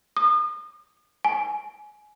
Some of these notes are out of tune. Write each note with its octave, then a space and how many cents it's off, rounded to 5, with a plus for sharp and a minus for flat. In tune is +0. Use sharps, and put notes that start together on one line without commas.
D#6 -40
G#5 +20